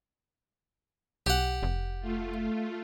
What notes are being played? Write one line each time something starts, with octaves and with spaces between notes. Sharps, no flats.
B1 G4 F#5
F1
A3 F4